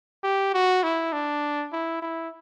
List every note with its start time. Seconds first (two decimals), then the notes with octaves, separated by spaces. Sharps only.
0.24 G4
0.54 F#4
0.83 E4
1.13 D4
1.72 E4
2.02 E4